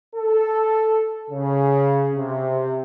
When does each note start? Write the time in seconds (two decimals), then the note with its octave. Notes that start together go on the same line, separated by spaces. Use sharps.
0.16 A4
1.30 C#3
2.16 C3